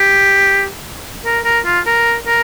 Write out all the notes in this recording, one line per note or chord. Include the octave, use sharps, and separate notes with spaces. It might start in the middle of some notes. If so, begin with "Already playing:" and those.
Already playing: G4
A#4
A#4
F4
A#4
A#4